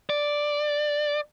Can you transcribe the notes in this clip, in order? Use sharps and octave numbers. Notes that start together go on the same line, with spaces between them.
D5